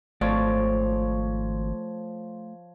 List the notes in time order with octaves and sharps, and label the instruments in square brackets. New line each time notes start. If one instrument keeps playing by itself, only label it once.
[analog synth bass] G#1 [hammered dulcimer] F3 C#5 [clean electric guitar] A3 D5